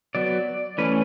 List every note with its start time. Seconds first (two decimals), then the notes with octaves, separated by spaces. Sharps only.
0.15 F#3 B3 D5
0.78 E3 A3 C#4 B4